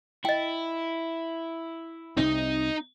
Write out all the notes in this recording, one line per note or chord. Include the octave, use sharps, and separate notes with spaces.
E4 D#5 G5
C2 C3 C4 D#4